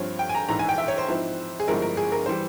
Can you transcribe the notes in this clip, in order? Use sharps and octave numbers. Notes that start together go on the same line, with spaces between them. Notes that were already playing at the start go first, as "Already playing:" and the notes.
Already playing: G2 F3 C4 C#5
G5
G#5
A#5
A#1 G#2 E3 A#5
G#5
G5
E5
C#5
C5
G#2 F3 C4 E4
G#4
G1 G2 F3 G#3 E4 A#4
A#4
G#4
A#4
E3 G3 C5